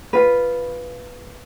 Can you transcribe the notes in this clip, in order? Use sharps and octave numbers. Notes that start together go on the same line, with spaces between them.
F4 B4